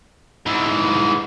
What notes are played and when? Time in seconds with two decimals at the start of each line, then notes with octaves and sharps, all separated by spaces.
0.46 G#2 E3